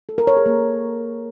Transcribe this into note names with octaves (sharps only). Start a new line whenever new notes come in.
A4
A#4
C#5
G#4
A#3